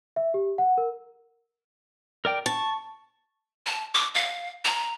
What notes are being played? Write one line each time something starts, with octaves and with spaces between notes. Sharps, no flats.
E5
G4
F#5
A#4
A#4 D5 G5
A5 C#6
A5
D6
F5
A#5